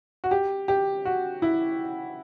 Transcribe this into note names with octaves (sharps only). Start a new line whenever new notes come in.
F#4
G4
G4
F#4
E4